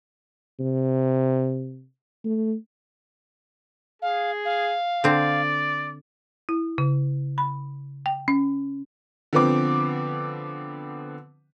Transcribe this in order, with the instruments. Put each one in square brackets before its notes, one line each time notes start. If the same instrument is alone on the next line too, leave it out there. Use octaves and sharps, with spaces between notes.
[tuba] C3
A3
[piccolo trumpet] G#4 [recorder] F5
[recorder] F5
[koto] D3 C4 [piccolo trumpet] D5
[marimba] E4
C#3
B5
G5
C#4
[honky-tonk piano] D3 F3 B3 C4 D6